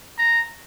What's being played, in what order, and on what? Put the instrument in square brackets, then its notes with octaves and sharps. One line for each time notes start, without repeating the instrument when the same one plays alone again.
[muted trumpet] A#5